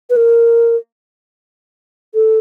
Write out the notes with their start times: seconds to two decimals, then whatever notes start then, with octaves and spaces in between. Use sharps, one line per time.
0.10 B4
0.16 A#4
2.14 A4